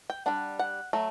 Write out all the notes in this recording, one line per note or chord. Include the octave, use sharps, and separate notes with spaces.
G5
G3 D4 F#5
F#5
F#3 A3